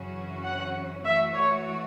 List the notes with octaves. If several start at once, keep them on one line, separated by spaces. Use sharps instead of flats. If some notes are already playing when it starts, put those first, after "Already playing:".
Already playing: F#2 C#3 E3 C#4 F#4
F#5
E3 A3 F#4 E5
C#5